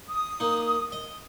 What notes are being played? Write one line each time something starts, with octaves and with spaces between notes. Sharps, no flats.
D#6
A#3 D#4
D#5